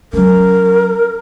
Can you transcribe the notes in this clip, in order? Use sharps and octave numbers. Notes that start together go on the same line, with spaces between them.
F#3 C#4 A#4